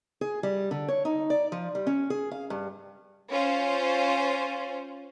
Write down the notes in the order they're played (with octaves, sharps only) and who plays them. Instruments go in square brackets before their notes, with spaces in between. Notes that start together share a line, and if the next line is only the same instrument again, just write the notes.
[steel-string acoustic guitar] G#4
G3
D3
C#5
D#4
D5
F3
G3
C#4
G#4
F5
G2
[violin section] C#4 F4 C5